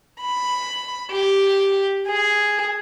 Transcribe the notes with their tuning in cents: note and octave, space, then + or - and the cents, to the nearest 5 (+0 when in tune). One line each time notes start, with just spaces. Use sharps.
B5 +5
G4 -5
G#4 +0